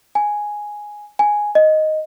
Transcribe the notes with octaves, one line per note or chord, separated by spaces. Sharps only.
G#5
G#5
D#5